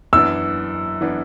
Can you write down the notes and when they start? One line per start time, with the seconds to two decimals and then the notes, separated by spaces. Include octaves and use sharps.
0.13 F#2 E3 B3 D4 E6
1.01 E3 B3 D4